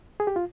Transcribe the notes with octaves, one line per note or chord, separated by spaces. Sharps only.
G#4
G4
F4